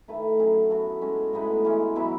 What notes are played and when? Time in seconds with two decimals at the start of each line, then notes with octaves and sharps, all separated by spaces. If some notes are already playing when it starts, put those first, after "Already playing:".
0.08 D#3 A3 E4 B4
0.39 F#3 C#4 E4 G#4
0.70 B3 F#4 A4
1.02 G#3 C#4 F#4
1.33 A2 G#3 B3 D#4
1.65 E3 G#3 C#4
1.96 B2 F#3 B3 E4